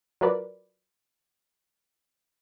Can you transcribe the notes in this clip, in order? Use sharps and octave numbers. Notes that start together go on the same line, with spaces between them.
F#3 F4 A#4 B4 D5